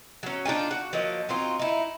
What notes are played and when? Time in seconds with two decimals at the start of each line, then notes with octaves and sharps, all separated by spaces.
0.23 F#3 C#4
0.45 D4 D#4 F4 G#5
0.71 F#4
0.93 F3 F#3 A#3 D#5
1.29 F#3 C4 D#4 F4
1.59 D#4 E4